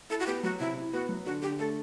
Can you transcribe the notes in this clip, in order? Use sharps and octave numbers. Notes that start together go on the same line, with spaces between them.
E4 A4
F#4
B3 G4
F#3 F#4
C3 E4
E4
B3 F#4
F#3
D3 F#4
D3 G4
A3 A4